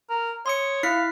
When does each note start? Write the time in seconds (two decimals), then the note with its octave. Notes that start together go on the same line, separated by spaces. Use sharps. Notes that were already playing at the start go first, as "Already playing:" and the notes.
0.09 A#4
0.46 C#5 C6 D#6 C#7
0.83 E4 F5 B6 C7